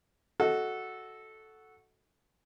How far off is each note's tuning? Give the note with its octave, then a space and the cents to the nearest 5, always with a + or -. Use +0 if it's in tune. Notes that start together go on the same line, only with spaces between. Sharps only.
F#4 +0 A4 -10 D#5 +25